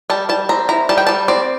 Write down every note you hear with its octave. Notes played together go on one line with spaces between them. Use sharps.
G3 A5
G3 A5
C4 A#5
E4 A#5
G3 A5
G5
G3 A5
C4 D5